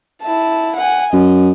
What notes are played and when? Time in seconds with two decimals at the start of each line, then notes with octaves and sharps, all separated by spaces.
0.22 E4 A5
0.77 F#5 G#5
1.13 F#2 D#5